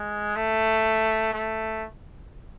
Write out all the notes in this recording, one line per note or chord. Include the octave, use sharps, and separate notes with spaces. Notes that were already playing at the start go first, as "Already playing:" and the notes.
Already playing: G#3
A3
A3